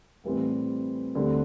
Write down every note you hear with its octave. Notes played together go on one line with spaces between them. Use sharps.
A2 E3 G3 C4
D2 D3 G3 C4